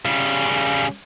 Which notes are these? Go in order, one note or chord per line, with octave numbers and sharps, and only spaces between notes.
C#3 G3